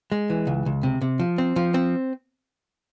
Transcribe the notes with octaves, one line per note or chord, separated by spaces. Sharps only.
G#3
E3
C#2
C#2
C3
C3
F3
C4
F3
C4